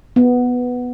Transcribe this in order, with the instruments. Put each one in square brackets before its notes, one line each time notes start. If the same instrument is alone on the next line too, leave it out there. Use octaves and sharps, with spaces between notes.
[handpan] B3